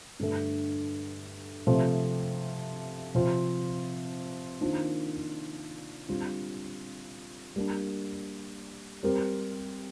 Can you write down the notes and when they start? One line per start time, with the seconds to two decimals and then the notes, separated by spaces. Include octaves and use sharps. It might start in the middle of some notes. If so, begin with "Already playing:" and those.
0.20 G2 D3 A3
1.67 C3 F3 A3 C4
3.14 C3 F3 C4 F4
4.61 D#3 A#3 D4 F4 C5
6.08 D3 G3 C4 F4
7.56 G3 A#3 D4
9.03 G3 C4 G4 A#4